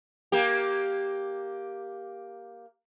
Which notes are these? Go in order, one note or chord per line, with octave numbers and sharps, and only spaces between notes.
A#3 G4